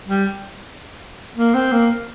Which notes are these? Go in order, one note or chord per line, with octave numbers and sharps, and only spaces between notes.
G3
A#3
C4
A#3